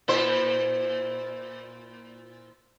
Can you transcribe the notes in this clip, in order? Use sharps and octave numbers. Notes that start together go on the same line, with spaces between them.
A#2 E4 C5